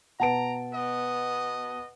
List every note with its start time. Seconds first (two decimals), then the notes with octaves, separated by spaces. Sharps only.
0.20 B2 B4 F#5 A5 A#5 D7
0.74 B3 D#5